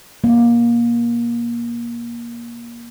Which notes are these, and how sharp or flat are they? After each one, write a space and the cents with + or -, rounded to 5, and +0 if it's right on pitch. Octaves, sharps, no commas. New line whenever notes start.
A#3 +20